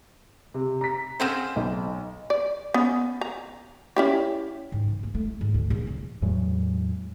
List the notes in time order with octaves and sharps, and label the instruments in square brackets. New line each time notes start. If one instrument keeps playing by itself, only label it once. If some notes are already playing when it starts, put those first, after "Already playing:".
[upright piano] C3
A#5 B6
[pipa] C#3 C4 C5 [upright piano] F#5 E7
[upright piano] B1
[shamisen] D5
B3 C#4
A#5
C#4 E4 G4
[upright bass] G#2
E3
A#3
A3
E4
G#2
D2
A#1
F2
[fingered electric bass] E2 A2 F#3 G#3